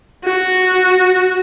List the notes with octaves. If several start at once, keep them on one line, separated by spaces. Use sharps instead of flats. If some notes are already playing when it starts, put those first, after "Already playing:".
F#4